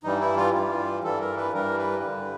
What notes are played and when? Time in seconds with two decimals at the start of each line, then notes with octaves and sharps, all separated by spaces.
0.04 G2 E3 G3 D#4
0.21 E4
0.37 F4
0.53 G2 E3 G3 F4
1.04 G2 E3 G3 A4
1.20 A#4
1.37 B4
1.53 G2 E3 G3 A#4
1.78 B4
2.03 G2 D3 G3